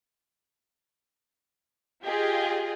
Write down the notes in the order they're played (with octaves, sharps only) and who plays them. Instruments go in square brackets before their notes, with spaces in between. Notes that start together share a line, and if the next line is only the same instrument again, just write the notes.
[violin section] F4 G4 G#4 D#5